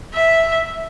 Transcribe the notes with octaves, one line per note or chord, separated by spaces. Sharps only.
E5